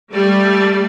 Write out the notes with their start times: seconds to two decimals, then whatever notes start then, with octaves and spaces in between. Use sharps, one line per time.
0.11 G3 A3 G4 D5